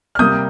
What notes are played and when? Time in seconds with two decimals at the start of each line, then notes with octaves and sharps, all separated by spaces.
0.15 F6
0.19 C3 G3 A#3 D#6 G6